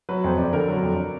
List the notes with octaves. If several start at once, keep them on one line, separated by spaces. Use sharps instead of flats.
F#3 B4
F2 C5
F2 D5
D3 A#4
F#3 A4
F2